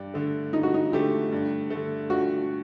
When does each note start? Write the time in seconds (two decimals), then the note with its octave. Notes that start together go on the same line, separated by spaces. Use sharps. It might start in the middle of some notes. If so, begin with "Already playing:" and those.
Already playing: G2 D4
0.14 D3 A3
0.53 G2 D#4
0.63 F#4
0.74 D#4
0.92 D3 A3 G4
1.32 G2
1.70 D3 A3
2.10 G2 F#4